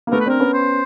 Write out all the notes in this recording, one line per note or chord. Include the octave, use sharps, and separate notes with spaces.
A#3
A3 B3 A#4
B4
C4 D4 A#4
B3 C#4
C5